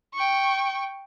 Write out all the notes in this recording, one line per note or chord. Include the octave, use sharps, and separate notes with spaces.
G5 C#6